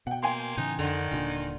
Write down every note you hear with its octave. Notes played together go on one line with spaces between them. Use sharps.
B2 F#5 G5
A#3 G5 G#5 C6
A2 C#3 E3 D#4
F2 D3 D#3
D#1 A#2 D4 F4